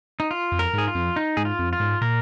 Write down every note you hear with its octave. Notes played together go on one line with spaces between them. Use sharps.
D#4
F4
F2
A#4
G#2 G#4
F4
F2
D#4
G#2 G#4
F4
F2
F4
G#2
A#2 A#4